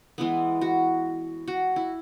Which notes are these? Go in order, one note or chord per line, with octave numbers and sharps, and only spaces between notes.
E3 G#3 B3 E4
F#4
F#4
E4